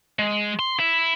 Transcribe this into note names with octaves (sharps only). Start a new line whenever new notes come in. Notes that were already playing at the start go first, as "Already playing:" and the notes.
G#3
C6
E4